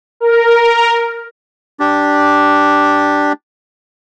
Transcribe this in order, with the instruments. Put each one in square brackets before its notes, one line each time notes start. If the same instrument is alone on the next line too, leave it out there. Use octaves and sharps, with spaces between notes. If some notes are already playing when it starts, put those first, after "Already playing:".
[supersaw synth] A#4
[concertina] D4 G4